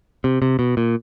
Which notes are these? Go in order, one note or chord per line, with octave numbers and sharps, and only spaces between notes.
C3
C3
B2
A#2